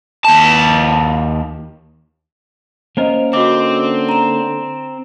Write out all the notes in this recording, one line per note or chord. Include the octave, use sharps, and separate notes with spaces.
D#2 A5
A#3 C#4 A#4 C5 D#5
D3 C4 F#4 D#5 D6
A#5 E7